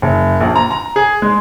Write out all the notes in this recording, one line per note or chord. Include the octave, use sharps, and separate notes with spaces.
F#1
A#1
A#5
A#5
G#4
G#3